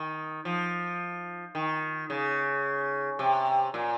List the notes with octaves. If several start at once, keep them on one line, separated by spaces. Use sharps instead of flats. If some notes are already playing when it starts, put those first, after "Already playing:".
Already playing: D#3
F3
D#3
C#3
C3
A#2